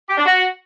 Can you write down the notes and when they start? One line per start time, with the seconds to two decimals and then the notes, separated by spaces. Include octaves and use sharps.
0.09 G4
0.17 D4
0.26 F#4